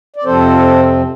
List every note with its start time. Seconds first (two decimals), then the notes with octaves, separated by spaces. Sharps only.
0.16 D5
0.24 F2 C3 F3 C4 A4 C5